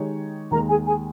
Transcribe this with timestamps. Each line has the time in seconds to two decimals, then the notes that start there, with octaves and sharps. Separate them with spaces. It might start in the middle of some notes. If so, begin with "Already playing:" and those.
Already playing: D#3 G#3 D#4 G4 C#5
0.51 D#2 D#3 G#3 A#4 A#5
0.69 G#4 G#5
0.86 G#4 G#5